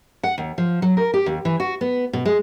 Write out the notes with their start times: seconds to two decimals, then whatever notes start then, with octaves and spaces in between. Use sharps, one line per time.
0.23 F#5
0.38 D#2
0.58 F3
0.82 F#3
0.97 A#4
1.14 G4
1.26 D#2
1.45 E3
1.60 F#4
1.81 B3
2.13 B2
2.25 G#3